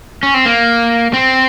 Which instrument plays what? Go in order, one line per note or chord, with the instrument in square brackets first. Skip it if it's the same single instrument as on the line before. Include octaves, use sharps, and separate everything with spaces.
[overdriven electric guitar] C#4
C4
A#3
C4